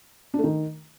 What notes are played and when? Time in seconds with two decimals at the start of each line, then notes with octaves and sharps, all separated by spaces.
0.34 D4
0.39 A3
0.44 D#3